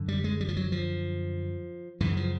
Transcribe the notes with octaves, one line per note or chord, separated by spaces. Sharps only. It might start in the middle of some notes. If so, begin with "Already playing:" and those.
Already playing: F#2 D3
G3
G#3
G3
F3
F#3
F3
F#2 C#3 E3
F3